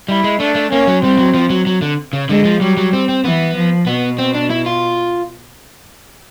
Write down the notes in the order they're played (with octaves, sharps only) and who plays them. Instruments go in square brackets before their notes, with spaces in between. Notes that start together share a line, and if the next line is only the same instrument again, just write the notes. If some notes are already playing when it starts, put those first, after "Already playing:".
[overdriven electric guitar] G3 [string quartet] E4
[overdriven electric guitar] G#3
[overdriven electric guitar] A3 [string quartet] D4
[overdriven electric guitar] A3
[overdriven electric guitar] A#3 [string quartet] C#4
[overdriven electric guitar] F#3
[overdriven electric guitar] G3 [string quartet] C4
[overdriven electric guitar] F#3
F3
F#3
F#3
D3
C#3
[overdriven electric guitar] D3 [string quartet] G#3
[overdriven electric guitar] F3
[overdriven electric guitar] F#3 [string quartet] G3
[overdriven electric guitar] F#3
C4
C4
[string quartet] E3 [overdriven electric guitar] B3
[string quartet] F3
[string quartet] B2 [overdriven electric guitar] B3
[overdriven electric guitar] C4
D4
E4
F4